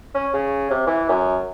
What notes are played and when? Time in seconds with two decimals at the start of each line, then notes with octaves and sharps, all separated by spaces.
0.15 C#4
0.34 C#3
0.71 C3
0.87 E3
1.09 F#2